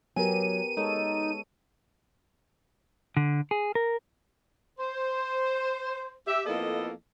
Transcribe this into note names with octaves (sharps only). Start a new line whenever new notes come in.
F#3 B3 G4 A#4 G#5 D#7
G#3 D#4 A4 C#5
D3
G#4
A#4
C5
G4 E5
F2 A#3 B3 E4 A4 D#5